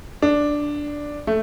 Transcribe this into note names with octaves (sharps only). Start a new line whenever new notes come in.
D4
A3